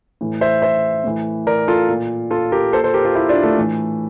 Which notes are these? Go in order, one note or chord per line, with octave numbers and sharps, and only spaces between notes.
A2 E3
C5 E5
C5 E5
A2 E3
A#4 D5
F4 A4
A#2
F4 A4
G4 A#4
A#2 A4 C5
A4 C5
G4 A#4
F4 A4
E4 G4
D4 F4
A3
A2 E3